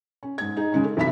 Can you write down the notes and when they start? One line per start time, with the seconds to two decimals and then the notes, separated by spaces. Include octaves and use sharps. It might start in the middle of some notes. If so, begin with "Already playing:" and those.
0.23 C#4
0.38 G#2 G#6
0.57 D#4 G#4
0.72 C#3 G#3 C#4
0.84 A4
0.97 B1 C3 E3 E5 B5 B6